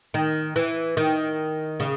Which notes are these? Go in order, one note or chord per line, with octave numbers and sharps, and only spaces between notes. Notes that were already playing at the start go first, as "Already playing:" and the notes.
D#3
E3
D#3
C#3